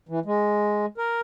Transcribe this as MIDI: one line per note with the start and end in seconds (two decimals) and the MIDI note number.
0.09 0.20 52
0.25 0.86 56
0.98 1.21 70